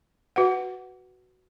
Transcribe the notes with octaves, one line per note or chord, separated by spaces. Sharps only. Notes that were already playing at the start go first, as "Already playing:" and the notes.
F#4 B4 F#5